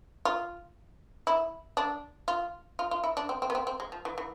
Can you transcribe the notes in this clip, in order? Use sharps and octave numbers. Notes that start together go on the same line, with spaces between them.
F4
E4
D4
F4
F4
F4
E4
D4
C4
C4
B3
C4
C4
G#3
F3
E3
E3